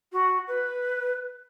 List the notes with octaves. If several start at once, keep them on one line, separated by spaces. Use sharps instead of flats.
F#4
B4